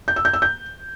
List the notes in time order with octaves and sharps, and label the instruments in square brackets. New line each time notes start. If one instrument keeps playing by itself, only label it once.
[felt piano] G6
E6
G6
E6
G6